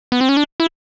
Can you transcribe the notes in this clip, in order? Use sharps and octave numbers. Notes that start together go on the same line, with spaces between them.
B3
C4
C#4
D4
E4